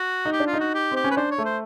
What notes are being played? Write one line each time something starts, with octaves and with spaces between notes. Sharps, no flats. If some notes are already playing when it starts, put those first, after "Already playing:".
Already playing: F#4
D#4
G4
D4
F4
D#4
F#4
G4
C4 G4
C#4
B4
D4 C5
C#5
A3
C5